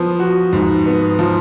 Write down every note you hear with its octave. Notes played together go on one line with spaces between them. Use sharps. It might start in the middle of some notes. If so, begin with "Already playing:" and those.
Already playing: F3 B3
F#4
G#2
B3
F3